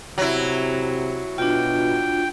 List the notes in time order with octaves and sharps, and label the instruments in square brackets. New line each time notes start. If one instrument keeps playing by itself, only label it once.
[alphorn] C3 [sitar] F#3 E4
[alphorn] B2 [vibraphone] D4 F4 [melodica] G5